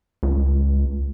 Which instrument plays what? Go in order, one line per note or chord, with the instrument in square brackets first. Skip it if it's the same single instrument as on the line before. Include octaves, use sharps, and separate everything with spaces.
[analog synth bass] C#2